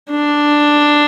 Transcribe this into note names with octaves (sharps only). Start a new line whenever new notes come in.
D4